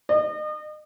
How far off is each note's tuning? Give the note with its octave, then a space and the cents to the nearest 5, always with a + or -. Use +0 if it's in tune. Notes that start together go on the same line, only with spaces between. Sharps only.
D#5 -35